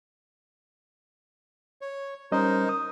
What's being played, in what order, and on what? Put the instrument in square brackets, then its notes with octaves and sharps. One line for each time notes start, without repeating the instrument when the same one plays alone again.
[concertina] C#5
[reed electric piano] G3 C#4 D#5 [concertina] D#4 A#4 C5
[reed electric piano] D#6